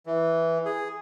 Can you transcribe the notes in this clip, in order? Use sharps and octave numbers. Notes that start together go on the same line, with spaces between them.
E3
G#4